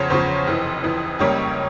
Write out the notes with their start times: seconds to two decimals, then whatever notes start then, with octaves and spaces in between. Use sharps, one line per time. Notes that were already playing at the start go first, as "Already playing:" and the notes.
Already playing: E2 C#3 F3 C5 C#5
0.10 E2 C#3 F3 C5
0.47 F1 F2 E3
0.83 F1 F2 E3
1.19 C#2 C#3 G3 A#3 C#4 C#5